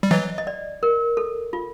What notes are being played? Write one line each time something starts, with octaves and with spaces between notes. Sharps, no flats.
G3
E3 F#3 D#5
D#5
D5
A#4
A4
F4